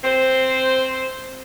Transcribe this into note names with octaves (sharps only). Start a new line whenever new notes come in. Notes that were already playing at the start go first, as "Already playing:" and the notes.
C4 C5